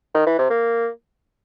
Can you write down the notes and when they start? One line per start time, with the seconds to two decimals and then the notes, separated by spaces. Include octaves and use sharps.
0.15 D#3
0.27 E3
0.38 C3
0.50 A#3